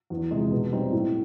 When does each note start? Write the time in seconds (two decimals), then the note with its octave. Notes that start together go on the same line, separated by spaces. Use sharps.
0.10 E2
0.31 C3 F3 G#3
0.51 B2
0.72 G3 C4 D#4
0.93 A2